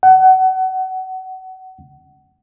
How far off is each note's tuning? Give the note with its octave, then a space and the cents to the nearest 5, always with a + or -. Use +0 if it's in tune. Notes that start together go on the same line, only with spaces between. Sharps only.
F#5 +25